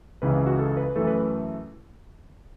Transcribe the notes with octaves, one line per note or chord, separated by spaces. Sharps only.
C#2 C#3 E3 B4
F#4
A4
B4
F#2 E3 A3 A4
B4